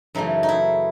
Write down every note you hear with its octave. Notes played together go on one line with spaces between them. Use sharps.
F#2 C#3 E3 A3 D#4
D#4
E4